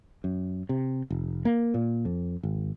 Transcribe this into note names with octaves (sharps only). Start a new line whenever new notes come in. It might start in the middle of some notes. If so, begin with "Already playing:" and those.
F#2
C3
F1
A#3
A#2
F2
G#1